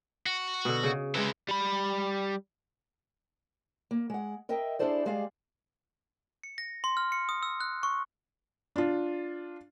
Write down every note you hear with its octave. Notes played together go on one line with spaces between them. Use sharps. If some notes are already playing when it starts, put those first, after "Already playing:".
F#4
B2 D3
C#3
C3 G#3 E4 B4
G3 B5
A#3
G#3 F#5
A#4 D#5 E5 G5
D4 E4 G#4 A4 C5 D5
G3 G#3 G#4 D5 F5
C#7
A#6
C6
F6
C#7
D#6
E6
F#6
C#6
D4 F4